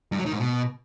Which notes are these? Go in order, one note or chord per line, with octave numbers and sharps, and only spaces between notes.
G2
F#3
D#3
G#2
B2